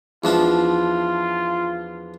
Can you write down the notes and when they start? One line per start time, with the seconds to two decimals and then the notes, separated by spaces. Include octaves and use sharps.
0.24 E2 F3 D4 F4